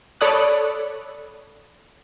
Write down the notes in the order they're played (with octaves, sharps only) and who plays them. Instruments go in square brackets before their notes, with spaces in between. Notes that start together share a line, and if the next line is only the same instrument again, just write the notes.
[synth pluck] A4 C#5 D5 B5 D#6 F#6